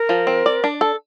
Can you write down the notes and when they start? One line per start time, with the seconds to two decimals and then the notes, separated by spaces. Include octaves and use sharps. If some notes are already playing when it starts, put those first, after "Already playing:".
Already playing: A#4
0.09 F3
0.27 C4
0.46 D5
0.64 D4
0.81 A4